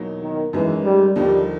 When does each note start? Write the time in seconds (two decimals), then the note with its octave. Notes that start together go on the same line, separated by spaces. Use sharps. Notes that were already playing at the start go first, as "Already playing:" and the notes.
Already playing: E2 B2 F#3 A#3 D#4
0.22 D#3
0.53 F#2 D#3 E3 G#3
0.84 G3
1.16 D#2 D3 F3 G3 A#3 D#4